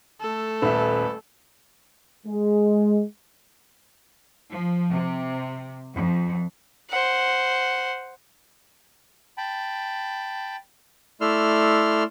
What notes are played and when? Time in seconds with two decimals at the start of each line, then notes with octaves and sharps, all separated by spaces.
0.21 A3 A4
0.62 D#1 B4 E5
2.27 G#3
4.50 F3
4.93 C3
5.93 F2
6.90 C5 F#5
9.38 G5 A5 B5
11.21 A3 E4 D5 C6 E6 F6